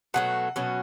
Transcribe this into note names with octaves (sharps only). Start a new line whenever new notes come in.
B2 F#3 A3 F#5
B2 F#3 C#4